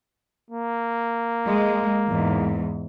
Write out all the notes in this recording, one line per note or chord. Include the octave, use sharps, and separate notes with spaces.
A#3
G#3
E2 G#2